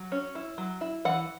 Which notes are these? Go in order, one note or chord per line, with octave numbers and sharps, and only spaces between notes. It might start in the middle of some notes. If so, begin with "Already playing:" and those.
Already playing: F#3
C#4
E4
F#3
E4
E3 F#5